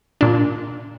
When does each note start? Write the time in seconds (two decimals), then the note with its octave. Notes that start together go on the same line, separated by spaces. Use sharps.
0.21 A#2 D4